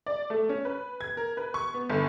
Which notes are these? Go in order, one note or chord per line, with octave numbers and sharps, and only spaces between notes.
D5
A3
C#4
B4
G#6
A#4
B4
C#6
B3
G1